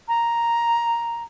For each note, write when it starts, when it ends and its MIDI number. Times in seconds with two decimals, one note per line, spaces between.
0.08 1.22 82